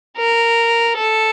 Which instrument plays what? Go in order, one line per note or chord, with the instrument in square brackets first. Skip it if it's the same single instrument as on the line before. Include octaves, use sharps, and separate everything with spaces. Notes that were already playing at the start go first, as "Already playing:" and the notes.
[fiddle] A#4
A4